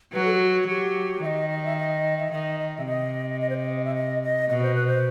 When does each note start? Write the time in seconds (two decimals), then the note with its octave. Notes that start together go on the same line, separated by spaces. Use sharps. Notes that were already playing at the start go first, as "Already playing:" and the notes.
0.13 F#3 B4
0.25 A4
0.33 G4
0.41 F#4
0.68 F#3 G4
1.22 D#3 E5
1.26 D#5
1.50 D#5
1.65 E5
1.77 D#5
2.18 E5
2.32 D#3 D#5 E5
2.59 D#5
2.77 E5
2.86 C3 D#5
3.41 D#5
3.50 C5
3.58 D#5
3.85 E5
3.95 D#5
4.23 D#5
4.49 B2 D#5
4.62 C5
4.75 B4
4.87 C5